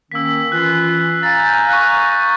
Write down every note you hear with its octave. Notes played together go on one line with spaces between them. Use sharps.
D#3 A#3 C#4 E6 B6
E3 C#4 F4 F#6
F5 G#5 A#5 A6
G6
C#6 F#6
F#6